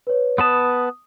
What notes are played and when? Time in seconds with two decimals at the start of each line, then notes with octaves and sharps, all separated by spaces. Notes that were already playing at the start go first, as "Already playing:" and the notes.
0.07 B4 C#5
0.38 B3 B4 A5 D#6